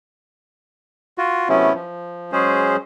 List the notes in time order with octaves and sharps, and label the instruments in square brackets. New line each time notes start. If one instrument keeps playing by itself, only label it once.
[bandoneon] F4 F#4
C3 F#3 A3 B3 C#4 E4
F3
F#3 G#3 C#4 G#4 C5